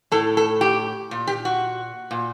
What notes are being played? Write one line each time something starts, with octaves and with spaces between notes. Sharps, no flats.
A2 A4
A4
G4
A#2
G4
F#4
A#2